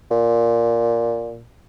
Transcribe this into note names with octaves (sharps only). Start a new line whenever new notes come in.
A#2